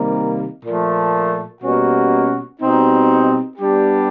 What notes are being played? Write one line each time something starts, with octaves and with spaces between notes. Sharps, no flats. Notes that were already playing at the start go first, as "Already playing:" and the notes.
Already playing: C3 D#3 G3 A#3
A#2 F3 A3
B2 G3 A#3 C#4 F#4
B2 G3 C4 D#4
G3 B3 D4 G4